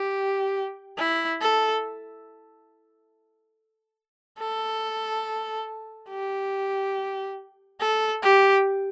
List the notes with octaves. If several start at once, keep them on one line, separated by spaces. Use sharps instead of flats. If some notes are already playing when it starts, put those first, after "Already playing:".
Already playing: G4
E4
A4
A4
G4
A4
G4